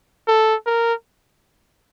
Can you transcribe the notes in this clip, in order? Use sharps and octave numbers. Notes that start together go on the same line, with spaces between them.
A4
A#4